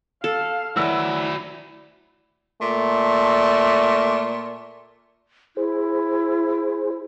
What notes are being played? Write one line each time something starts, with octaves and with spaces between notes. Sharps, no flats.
A4 F5
E3 F#3 E4 F#4 D5 E6
A#2 A3
E4 G#4 C5